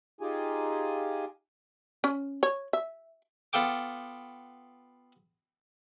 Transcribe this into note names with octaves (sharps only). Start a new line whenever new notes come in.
D#4 F4 G4 G#4 G#5
C#4
C#5
E5
B3 F4 A4 G5 D6